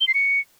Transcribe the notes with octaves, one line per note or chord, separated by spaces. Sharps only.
G7
C7
C#7